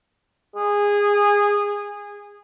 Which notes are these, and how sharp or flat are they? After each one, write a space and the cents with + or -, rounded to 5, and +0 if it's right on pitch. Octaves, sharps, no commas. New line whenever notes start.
G#4 -20